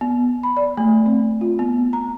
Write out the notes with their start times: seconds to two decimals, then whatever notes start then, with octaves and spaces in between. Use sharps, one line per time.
0.01 B3
0.43 B5
0.57 D5
0.77 A3
1.06 C4
1.41 F4
1.59 B3
1.93 A#5